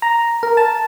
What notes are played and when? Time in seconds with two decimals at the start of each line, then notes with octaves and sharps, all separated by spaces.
0.02 A#5
0.43 A#4
0.57 A5